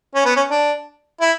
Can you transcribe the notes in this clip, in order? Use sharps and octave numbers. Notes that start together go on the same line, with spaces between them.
C#4
B3
C#4
D4
E4